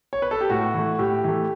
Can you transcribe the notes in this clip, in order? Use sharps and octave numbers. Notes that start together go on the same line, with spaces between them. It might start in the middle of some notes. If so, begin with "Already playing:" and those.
C#5
B4
A4
G4
A2 F#4
E3 A3
A2 G4
E3 A3